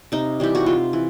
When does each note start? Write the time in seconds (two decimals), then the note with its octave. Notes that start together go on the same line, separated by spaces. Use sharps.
0.12 C3 D#4
0.40 E3 G3 G4
0.55 F#4
0.66 C3 F4
0.93 E3